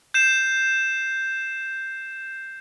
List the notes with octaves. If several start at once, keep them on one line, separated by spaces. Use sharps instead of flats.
G6 C7 E7